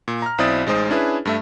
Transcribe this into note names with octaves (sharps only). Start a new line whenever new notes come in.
A#2
A#5 F6
B1 C4 E4 D5 D#6 A6
A1 G#3 D#4 C5 D#6
C#4 D4 E4 G#4 B4
G2 A3 E5